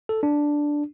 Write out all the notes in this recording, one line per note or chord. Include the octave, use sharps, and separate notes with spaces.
A4
D4